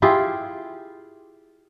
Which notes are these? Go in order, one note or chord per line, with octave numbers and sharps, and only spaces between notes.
E4 F4 G4 G#4